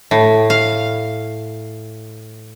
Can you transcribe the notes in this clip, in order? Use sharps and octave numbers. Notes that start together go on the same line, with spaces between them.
A2
F5